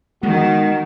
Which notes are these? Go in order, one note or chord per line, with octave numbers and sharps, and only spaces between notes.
D#3 G#3 B3 F#4